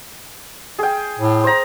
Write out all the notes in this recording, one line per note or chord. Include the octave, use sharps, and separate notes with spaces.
G#4 G5
A2
C5 A#5